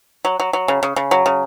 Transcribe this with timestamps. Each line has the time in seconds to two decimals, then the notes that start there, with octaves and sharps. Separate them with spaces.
0.25 F#3
0.40 F#3
0.53 F#3
0.68 C#3
0.83 C#3
0.96 C#3
1.11 F#3
1.26 C#3